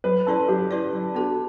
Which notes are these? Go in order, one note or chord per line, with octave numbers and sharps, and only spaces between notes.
F#3 B4
C#4 E4 A4 B4 D5
F#3 G4
C#4 E4 B4 D5
F#3
B3 D4 F#4 A4